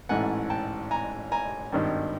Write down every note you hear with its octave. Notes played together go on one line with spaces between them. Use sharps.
A1 G#2 E3 A3 F#5 G#5
G5 A5
G#5 A#5
G#5 A#5
G#1 G2 D#3 G3